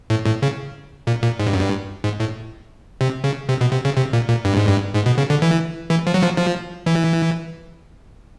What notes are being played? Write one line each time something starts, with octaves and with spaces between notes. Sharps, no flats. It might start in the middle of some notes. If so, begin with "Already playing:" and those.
A2
A2
C#3
A#2
A#2
G#2
G2
F#2
G2
G#2
A2
C3
C#3
C3
B2
C3
C#3
C3
A#2
A#2
G2
G#2
G2
G#2
B2
C#3
D3
E3
E3
F3
F#3
F3
F3
E3